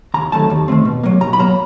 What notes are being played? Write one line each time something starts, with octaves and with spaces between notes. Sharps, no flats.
D#2 A#5
D#3 F#3 A3 C4 A5
D#2
D#3 F#3 A3 C4
B2
F#3 A#3
B2 A#5
B5
F#3 A#3 A#5